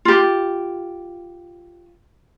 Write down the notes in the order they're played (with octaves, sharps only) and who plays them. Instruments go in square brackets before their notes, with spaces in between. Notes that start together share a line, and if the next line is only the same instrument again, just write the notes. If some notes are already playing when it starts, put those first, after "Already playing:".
[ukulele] F4 G4